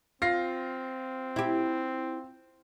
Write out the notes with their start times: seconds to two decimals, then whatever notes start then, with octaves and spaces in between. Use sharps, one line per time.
0.22 C4 F4 A#6 C7
1.36 E4 G4